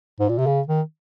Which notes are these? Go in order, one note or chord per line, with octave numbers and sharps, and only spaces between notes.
G#2
A#2
C3
C#3
D#3